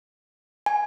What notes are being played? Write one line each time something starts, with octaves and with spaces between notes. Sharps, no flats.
G#5